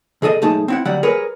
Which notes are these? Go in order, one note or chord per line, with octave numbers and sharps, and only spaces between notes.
B2 G#4 A4 D#5
B1 G#2 A3 D#4 G#4 A5
C4 E4 F#5
D2 F#3 G3 F#5
G#4 A#4 B4 C#5